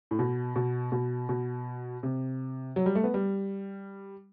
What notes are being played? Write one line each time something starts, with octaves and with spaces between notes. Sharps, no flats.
A2
B2
B2
B2
B2
C3
F#3
G3
A3
B3
G3